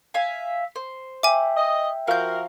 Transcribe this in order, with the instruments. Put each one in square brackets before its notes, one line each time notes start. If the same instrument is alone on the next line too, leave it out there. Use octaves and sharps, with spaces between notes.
[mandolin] E5 F5 G#5
C5
[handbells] E5 G5 [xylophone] G#5 D6
[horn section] D#5
[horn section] F3 F#4 A#4 [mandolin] F5 G6